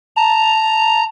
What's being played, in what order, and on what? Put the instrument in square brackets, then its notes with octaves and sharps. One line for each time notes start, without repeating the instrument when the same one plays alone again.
[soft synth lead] A5 [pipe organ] A#5